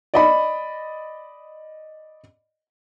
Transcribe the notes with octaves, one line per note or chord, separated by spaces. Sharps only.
D5 D#5 B5